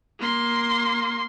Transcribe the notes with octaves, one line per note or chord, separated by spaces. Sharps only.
A#3 C6